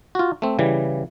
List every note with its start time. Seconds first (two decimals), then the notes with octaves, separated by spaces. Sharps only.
0.15 F4 F#4
0.42 A3 C4
0.59 C#3 E3 G3